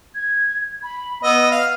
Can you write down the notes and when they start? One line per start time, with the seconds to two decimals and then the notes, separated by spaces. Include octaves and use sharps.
0.15 G#6
0.83 B5
1.23 B3 D#5 E6
1.52 F5 F6